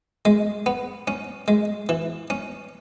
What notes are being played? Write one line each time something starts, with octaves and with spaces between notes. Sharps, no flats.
G#3
B3
C#4
G#3
E3
C#4